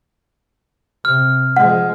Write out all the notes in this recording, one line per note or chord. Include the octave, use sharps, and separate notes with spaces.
C3 F6
F3 G#3 F#5